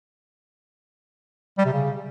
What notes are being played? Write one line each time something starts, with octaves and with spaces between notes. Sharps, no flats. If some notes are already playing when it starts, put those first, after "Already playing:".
G3
C3
C#3